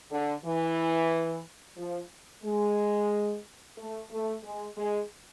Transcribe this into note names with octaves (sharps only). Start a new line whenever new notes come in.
D3
E3
F3
G#3
A3
A3
G#3
G#3